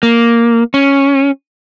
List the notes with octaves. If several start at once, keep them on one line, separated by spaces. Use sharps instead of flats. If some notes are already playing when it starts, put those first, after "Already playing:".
A#3
C#4